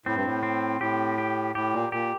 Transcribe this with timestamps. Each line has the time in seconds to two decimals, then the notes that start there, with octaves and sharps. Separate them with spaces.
0.06 A2 C4
0.16 G2
0.25 A2
0.43 C4
0.81 A2 G4
1.18 G4
1.55 A2 G4
1.73 A#2
1.92 A#2 G4